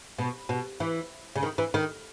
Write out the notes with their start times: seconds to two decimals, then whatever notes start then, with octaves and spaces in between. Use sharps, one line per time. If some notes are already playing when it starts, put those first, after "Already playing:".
0.18 B2
0.49 B2
0.80 E3
1.36 C#3
1.43 D#3
1.58 E3
1.74 D#3